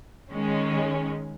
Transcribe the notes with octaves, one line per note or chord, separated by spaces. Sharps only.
D#3 G#3 C#4